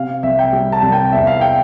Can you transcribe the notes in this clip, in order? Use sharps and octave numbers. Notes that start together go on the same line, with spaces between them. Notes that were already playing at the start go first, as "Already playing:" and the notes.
Already playing: C3 F5
C2 E5
G5
G3
A5
C2
G5
E2 E5
F5
G5